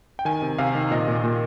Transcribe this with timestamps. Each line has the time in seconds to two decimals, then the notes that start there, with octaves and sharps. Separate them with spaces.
0.19 G5
0.25 D#3 G#5
0.42 C3
0.58 C3 F5
0.75 D#3
0.91 A#2 D#5
1.08 A#2
1.24 A#2